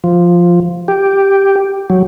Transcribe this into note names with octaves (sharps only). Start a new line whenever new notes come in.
F3
G4
F#3